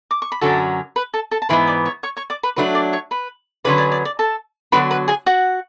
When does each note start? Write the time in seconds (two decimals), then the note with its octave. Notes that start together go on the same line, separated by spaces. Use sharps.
0.11 D6
0.22 C#6
0.32 B5
0.41 F#2 D3 F#3 C#4 F#4 A4 A5
0.96 B4 B5
1.14 A4 A5
1.31 A4 A5
1.42 A5
1.49 G#2 E3 B3 B4 B5
1.67 D5 D6
1.85 C#5 C#6
2.03 C#5 C#6
2.17 C#5 C#6
2.30 D5 D6
2.43 B4 B5
2.56 F#3 A3 D4 B4 B5
2.75 D5 D6
2.93 C#5 C#6
3.11 B4 B5
3.64 D3 F#3 C#4 G#4 B4 D5
3.78 D5
3.92 D5
4.05 D5
4.19 A4 A5
4.72 D3 F#3 B3 F#4 B4 B5
4.91 B4 B5
5.08 G#4 G#5
5.26 F#4 F#5